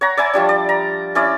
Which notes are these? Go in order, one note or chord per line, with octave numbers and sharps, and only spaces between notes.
C#5 F#5 A#5
C#5 E5 G#5 B5
F3 G3 D4
D5
A#5
C#4 E4 D5